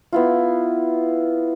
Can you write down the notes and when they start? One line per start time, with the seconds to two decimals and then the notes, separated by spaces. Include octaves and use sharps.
0.12 B3 E4 F4